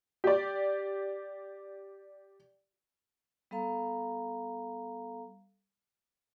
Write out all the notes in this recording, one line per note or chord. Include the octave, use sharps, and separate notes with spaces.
G4 D5
G3 B3 A4 F5 A#5